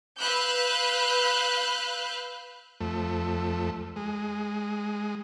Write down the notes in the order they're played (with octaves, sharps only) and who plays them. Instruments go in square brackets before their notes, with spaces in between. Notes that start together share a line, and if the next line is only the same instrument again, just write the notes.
[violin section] B4 F5 B5 E6 F#6 G6
[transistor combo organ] F2 A3
G#3